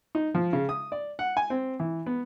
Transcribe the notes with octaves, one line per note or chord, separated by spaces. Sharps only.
D#4
F3
C#3
D#6
D5
F#5
G#5
C4
E3
B3